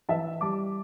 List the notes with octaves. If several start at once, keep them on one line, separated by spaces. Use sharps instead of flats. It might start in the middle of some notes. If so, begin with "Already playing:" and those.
E3 E5 A5
G3 A5 D6